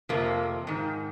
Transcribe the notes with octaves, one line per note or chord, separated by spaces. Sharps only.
F2 C3 F3 A#3
G#2 D#3